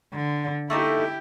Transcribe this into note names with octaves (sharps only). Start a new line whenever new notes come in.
D3
A3 A#3 D#4 E4 G4